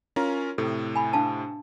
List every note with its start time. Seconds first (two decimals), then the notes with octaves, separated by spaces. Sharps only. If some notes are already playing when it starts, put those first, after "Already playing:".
0.16 C#4 E4 F4 A#4
0.58 A2 C3 A4
0.96 G#5 B5
1.13 D4 F5 A5